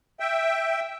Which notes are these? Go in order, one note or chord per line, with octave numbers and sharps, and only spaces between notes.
E5 G5